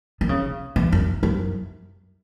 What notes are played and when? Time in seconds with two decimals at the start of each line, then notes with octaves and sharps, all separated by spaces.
0.21 D#3
0.29 C#3
0.76 E3
0.92 F#2
1.23 F#2